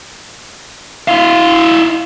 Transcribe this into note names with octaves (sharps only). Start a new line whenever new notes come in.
E4 F5